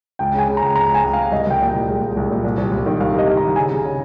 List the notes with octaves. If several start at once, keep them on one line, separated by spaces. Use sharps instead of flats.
C#2 G5
C#3 G#5
C#3
A#5
C#2
C#2 A#5
C#2
G#5
C#2
F5
C#2
C2 D#5
C2 G5
A#2
C2 G5
G#3
G#3
C2
A#2
C2
C2
C2
D#3
C2 F5
C3
D#5
C2
D#3 A#5
C#3 G#5
C#3
C#3